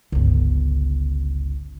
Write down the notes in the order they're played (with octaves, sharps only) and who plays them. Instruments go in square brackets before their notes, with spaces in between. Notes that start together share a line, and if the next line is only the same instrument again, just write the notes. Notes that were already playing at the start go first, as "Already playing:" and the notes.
[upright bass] G1 C#2